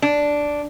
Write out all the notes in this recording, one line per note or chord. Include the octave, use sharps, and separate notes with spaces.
D4